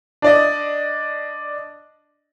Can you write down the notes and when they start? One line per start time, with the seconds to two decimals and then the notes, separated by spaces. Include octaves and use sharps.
0.22 D4 D5 D#5